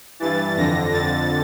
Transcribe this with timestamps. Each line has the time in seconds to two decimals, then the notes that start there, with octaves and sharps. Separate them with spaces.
0.20 G2 E3 A6
0.57 F2 D3 A#6
0.91 F2 D3 A6